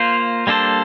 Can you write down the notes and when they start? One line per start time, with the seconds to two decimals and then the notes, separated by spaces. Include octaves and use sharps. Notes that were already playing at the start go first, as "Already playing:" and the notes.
Already playing: A#3 F4 C5
0.47 G3 A#3 D4 A4 C5